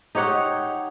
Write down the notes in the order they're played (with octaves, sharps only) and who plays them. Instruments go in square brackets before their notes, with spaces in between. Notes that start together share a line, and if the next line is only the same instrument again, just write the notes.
[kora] D#4 G4 C#5 F#5